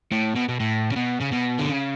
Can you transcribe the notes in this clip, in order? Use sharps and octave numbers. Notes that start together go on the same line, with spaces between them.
A2
B2
B2
A2
C#3
B2
C#3
B2
D3
C#3